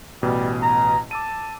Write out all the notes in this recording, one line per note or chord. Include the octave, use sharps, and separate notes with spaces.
A1 B2 G3
A#5
A5 D6 E6 D#7